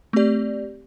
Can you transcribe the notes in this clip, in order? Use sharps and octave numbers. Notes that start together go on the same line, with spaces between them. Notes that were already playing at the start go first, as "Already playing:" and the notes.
A3 C4 G4 D5